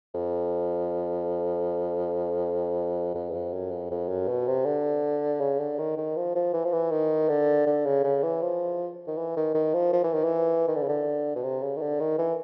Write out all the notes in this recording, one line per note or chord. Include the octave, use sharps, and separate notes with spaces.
F2
F2
E2
F2
F#2
F2
F2
F#2
B2
C3
D3
C#3
D3
D#3
D#3
F3
F3
E3
F3
E3
D#3
D3
D3
C#3
C#3
E3
F3
D#3
E3
D#3
D#3
F3
F3
E3
D#3
E3
D#3
D3
C#3
D3
B2
C3
C#3
D#3
D3
D#3
E3